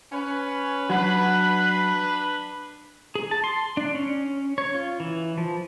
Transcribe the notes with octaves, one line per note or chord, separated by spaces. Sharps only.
C#4 B4
F#3 D4 B4
G#4
A5
C6
D4
C#4
C#5
F4
E3
F3